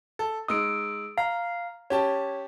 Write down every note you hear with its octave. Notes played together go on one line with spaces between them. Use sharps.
A4
G#3 D#4 D#6 E6 D7
F5 A#5
C#4 G4 C#5 A5